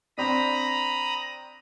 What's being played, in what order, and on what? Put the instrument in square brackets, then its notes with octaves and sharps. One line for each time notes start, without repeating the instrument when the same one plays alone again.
[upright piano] C4 D4 [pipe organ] A#5 B5 D#6